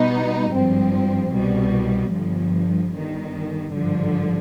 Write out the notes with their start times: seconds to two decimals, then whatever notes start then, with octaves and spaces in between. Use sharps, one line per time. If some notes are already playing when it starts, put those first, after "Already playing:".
Already playing: B2 G3 B3 D#4
0.52 G#1 G2 F3 C4
1.33 C2 B2 G3
2.13 G1 G2 F3
2.93 G1 G2 D#3
3.73 G#1 G2 D3 F3